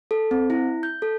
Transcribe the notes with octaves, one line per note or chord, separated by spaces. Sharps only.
A4
C4
E4
G6
A4